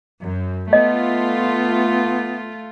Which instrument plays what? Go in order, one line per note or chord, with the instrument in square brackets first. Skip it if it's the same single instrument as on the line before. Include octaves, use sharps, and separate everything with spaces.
[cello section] F#2
[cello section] A3 F4 [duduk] B3 [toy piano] D#5